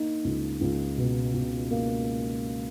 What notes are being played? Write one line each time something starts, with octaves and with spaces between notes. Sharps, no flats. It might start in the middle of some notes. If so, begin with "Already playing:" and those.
Already playing: A#3 D#4
C#2
C#2
B2
B2
A#3